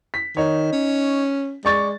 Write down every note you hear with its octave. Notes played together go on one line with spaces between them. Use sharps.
B6
D#3 D#4 C#5
C#4
G#3 D5 C#6 A6